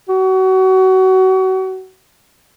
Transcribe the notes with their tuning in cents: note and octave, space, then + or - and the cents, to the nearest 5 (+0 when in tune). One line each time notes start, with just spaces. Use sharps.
F#4 +30